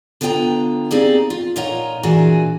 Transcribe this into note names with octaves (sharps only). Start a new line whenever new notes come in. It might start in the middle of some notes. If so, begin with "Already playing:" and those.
D3 B3 F4 C5 G5 A#5
A#3 C4 D#4 G4 G#4 D5
F4
A#2 D#4 F4 C#5 F#5 A#5
A#2 E3 D4 F#4 G#4